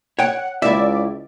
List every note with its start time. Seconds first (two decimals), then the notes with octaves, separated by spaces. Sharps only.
0.19 C#5 F#5 G5
0.62 C#2 E4 D5 E5